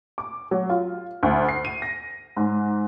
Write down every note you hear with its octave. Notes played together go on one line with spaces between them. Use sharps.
D6
F#3
F4
D2
C7
D#7
A#6
G#2